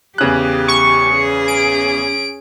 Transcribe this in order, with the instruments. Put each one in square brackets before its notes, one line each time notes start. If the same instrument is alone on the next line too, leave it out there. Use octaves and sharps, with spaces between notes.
[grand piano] E2 C#3 F#6 [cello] G4
[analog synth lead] C#6
[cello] C#4 G#4
[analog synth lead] D7